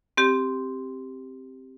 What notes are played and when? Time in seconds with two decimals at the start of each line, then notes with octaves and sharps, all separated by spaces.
0.17 C4 G4